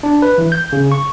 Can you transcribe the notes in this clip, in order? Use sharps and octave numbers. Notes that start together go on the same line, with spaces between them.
D4
B4
E3
G6
C#3
C#6